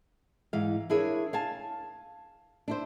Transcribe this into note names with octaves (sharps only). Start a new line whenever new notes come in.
G#2 E3 F5
D4 E4 G#4 A#4 C#5
F5 G#5 A5
D4 E4 C5